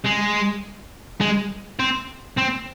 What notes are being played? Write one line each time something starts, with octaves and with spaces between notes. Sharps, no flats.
G#3
G#3
C4
C4